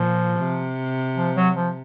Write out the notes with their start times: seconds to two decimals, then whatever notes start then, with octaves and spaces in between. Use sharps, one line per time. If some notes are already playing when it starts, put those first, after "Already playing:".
Already playing: A#2 F3
0.39 C3
1.17 F3
1.36 F#3
1.56 F3